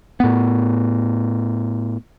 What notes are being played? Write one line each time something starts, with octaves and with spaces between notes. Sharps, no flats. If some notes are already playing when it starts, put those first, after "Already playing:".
A2 B3